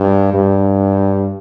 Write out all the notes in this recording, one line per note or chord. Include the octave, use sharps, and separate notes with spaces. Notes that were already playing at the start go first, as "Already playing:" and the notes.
Already playing: G2
G2